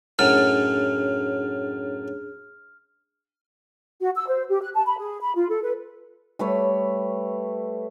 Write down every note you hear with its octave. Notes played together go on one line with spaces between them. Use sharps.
F#2 A2 F#3 D4 G#4 F6
F#4
E6
C5
G4
F#6
A5
B5
G#4
B5
F4
A4
B4
G3 A3 B4 C#5